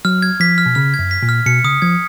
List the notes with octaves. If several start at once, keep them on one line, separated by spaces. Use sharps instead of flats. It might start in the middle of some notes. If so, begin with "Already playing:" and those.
F#3 F6
G#6
F3 B6
F6
B2
C#3 F6
G#6
F#2
B6
A#2
F6
B2 C#7
C#3 D#6
F3 G#6